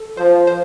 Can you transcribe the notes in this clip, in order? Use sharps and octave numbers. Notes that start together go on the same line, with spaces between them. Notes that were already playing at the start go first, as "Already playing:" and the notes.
Already playing: A4
F3 C5
C5